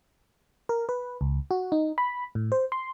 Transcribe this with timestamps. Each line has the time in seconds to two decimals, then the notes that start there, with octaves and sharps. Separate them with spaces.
0.69 A#4
0.89 B4
1.21 C#2
1.51 F#4
1.72 D#4
1.98 B5
2.35 A2
2.52 C5
2.72 C6